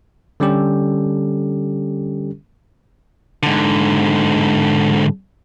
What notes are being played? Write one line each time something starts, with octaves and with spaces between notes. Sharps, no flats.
D3 G3 C#4 G4 A4
G#2 D3